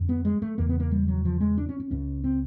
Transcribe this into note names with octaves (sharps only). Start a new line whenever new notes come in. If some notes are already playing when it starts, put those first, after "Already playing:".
Already playing: F2 D3
B3
G#3
A3
E2 C#3 A#3
B3
A#3
G3
F#3
F3
G#3
D4
C#4
C#4
C#2 C#3 C#4
C4